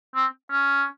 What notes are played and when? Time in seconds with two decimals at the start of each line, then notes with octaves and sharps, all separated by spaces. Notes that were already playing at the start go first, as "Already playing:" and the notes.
0.15 C4
0.51 C#4